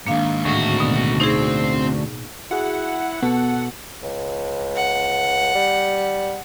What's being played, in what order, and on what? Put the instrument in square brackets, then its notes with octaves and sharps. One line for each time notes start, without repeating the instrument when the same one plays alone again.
[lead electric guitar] G#2 D#3 [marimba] A#3 D4 F5
[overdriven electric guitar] D2 F#4 [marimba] A2
[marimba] B2 B3
[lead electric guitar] C4 C5 [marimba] D#4 G#4
[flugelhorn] E4 [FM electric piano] F#4 G#4 [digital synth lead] F#5
[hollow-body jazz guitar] B2 [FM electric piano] B3 [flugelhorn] A4
[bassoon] C#2
[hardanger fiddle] F#5
[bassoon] G3